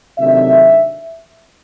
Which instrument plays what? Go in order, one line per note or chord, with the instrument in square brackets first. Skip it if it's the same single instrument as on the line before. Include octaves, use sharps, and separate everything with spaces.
[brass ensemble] C3 D#3 F#3 A3 D4 E5